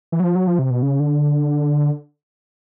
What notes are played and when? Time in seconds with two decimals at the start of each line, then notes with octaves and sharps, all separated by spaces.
0.12 E3
0.20 F#3
0.24 F3
0.35 F#3
0.47 F3
0.59 C3
0.70 B2
0.83 C#3
1.00 D3